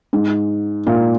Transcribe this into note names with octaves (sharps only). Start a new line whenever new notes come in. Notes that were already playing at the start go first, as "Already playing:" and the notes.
G#2
A#2